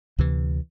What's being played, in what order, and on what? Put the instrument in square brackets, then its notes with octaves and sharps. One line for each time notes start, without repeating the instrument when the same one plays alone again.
[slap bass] D2 C3 E3